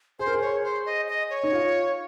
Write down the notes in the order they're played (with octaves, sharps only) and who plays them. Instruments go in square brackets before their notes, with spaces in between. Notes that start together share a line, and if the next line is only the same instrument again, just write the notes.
[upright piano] G#4 [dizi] C5
[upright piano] A#4
G#4
[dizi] C#5
C5
D#5
D#5
C#5
[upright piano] D#4
F4